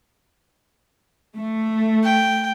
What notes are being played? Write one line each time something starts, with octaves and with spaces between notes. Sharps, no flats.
A3
G5